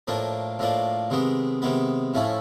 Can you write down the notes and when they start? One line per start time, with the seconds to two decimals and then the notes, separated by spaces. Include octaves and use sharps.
0.07 A2 F3 A#3 D4
0.59 A2 F3 A#3 D4
1.10 C3 D#3 G#3 B3
1.62 C3 D#3 G#3 B3
2.14 A2 F3 A3 C#4 E4